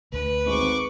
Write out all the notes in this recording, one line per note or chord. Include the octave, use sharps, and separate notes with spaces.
D2 B4
G#1 C#6 D6